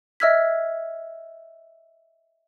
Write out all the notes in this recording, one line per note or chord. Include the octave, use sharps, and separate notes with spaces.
D#5 E5 E6 F6 G#6 B6